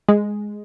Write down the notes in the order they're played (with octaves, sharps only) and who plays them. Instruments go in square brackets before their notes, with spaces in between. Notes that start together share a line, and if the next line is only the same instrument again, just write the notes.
[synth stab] G#3